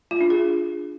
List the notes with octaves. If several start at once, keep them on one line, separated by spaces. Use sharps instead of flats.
F4
D4
G#4